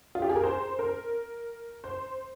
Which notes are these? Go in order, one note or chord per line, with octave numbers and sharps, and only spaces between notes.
F4
G4
G#4
A#4
C5
A#4
C5